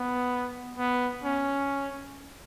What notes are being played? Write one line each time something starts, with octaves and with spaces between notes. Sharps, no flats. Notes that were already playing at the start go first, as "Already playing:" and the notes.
Already playing: B3
B3
C#4